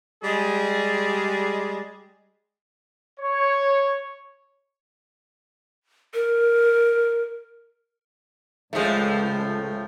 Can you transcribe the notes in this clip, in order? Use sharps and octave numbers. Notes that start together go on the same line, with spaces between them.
G3 G#3 G#4
C#5
A#4
C#2 A2 F3 G#3 A3